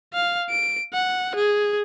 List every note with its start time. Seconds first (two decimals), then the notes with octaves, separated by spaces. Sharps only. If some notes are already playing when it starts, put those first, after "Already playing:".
0.14 F5
0.50 D7
0.94 F#5
1.36 G#4